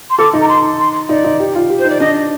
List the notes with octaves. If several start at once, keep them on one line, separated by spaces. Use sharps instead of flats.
C6
A4 D6
D#4
A#5
C6
C6
D#4 D5
D#4
G4
F4
G4
C5
D#4
D5
D4 D#5